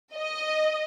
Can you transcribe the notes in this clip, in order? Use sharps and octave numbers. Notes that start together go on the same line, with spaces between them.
D#5